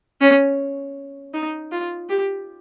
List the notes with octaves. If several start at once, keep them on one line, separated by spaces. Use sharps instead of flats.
C#4
D#4
F4
G4